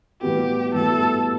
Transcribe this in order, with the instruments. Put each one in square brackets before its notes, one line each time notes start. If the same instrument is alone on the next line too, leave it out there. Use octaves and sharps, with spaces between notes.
[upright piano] A2 E3 G3 B3 F#4 [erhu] G4
[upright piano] A2 E3 G3 B3 F#4 [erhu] A4